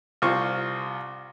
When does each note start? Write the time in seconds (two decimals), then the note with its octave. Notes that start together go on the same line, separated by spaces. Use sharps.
0.22 C2 F4 C5 C#6